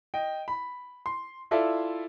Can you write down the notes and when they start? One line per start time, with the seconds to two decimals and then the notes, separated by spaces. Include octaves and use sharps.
0.14 D#5 G5
0.48 B5
1.06 C6
1.51 E4 F4 A4 D5 E5 F5